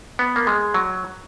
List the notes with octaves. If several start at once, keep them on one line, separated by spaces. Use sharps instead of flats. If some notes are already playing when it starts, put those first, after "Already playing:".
B3
A#3
G#3
F#3